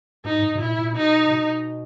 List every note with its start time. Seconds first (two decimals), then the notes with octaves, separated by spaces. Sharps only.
0.24 G#2 D#4
0.42 G#2
0.55 B2
0.60 A#2 E4
0.78 A#2
0.96 B2 D#4
1.31 B2